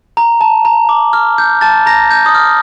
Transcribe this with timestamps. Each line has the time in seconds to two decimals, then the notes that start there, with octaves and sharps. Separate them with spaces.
0.17 A#5
0.41 A5
0.65 A#5
0.89 D6
1.13 F6
1.38 G6
1.61 A5 A6
1.86 A#5 A#6
2.11 G6
2.26 D#6
2.35 F6